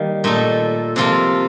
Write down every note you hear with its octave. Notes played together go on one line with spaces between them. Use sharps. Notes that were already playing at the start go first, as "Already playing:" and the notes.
Already playing: D#3 G3 A#3
A#2 A3 D#4 A4
C3 F3 A#3 F4 A4